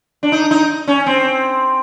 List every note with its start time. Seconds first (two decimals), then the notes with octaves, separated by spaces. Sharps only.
0.23 D4
0.32 D#4
0.51 D#4
0.87 C#4
1.06 C4